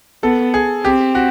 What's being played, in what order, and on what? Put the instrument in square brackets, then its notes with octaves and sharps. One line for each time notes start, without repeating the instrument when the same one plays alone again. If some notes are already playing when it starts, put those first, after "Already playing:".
[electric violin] B3 [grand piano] A4
[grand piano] G#4
[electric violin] C4 [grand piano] G4
[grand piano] F#4